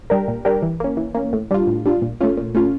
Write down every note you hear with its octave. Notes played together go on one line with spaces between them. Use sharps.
G3 D4 G4 A#4
A#2
G3 D4 G4 A#4
E3
A#3 C#4
E3
A#3 C#4
A2
G3 D4 F4
A2
G3 D4 F4
A#2
A3 C#4 F4
A#2
A3 C#4 F4